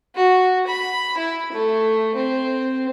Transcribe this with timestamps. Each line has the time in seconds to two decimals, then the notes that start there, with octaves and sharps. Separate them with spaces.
0.15 F#4
0.67 B5
1.18 E4
1.52 A3
2.15 C4